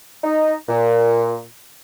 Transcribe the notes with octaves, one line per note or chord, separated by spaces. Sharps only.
D#4
A#2